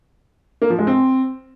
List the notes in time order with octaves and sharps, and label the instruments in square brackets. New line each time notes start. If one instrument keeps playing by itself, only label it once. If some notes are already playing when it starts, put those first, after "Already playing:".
[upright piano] A#3
F3
G#3
C4